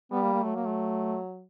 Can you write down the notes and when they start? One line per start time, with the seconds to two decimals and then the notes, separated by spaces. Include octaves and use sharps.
0.12 G3 B3
0.23 A#3
0.33 A#3
0.44 F#3 A3
0.56 A#3
0.66 A3